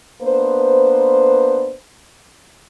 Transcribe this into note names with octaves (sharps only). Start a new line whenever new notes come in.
A#3 B3 D4 B4 C5